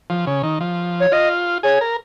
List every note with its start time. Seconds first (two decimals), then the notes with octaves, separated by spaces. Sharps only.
0.10 F3
0.27 C#3
0.43 D#3
0.60 F3
1.00 C#5
1.12 F4 D#5
1.63 G#4 C#5
1.81 A#4